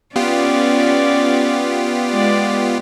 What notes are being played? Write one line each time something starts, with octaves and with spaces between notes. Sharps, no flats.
B3 C#4 F4 G4 D5
G#3 D5